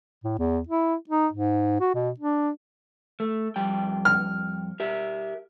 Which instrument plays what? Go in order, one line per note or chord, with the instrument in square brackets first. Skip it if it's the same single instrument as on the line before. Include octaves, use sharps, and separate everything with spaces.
[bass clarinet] A2
E2
E4
D#4
G#2
F#4
B2
D4
[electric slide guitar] A3
F2 G3 G5
[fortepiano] F6
[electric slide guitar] G4 A#4 E5